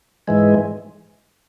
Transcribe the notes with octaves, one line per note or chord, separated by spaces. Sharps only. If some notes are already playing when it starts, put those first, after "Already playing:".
G#2 E3 G#3